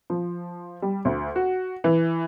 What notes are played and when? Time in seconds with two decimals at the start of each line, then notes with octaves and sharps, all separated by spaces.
0.10 F3
0.82 G3
1.05 D2
1.36 F#4
1.84 E3